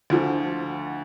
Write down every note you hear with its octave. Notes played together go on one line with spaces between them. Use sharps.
D2 D3 F3